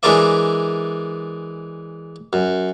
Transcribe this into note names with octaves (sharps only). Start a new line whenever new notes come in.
E3 G#3 D4 A#4 D5 E5
F#2